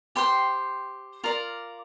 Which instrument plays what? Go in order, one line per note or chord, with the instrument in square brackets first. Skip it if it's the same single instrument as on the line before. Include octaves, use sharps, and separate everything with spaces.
[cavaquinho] G4 C5 G5 C6
F4 A#4 D5